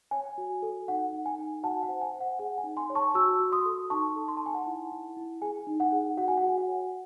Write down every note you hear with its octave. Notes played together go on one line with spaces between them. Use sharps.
C#5 G#5
F#4
A4
D#4 F#5
D#4
G#5
D#4
F#4 F#5 A5
F#5
C5
G#5
C5
F#5
G#4 F#5
G#5
D#4
G#5 C6
C#5
A5 C#6
F#4 C#6 E6
F#4
C6 D#6
A4
D#4 A5 C#6
A4
C6
D#4 A5
G#5
F#5 A5
E4
E4
E4
G#4 G#5
D#4
F#5
G#4
F#4 F#5
G#5
F#5
F#4 G#5
F#5
C#5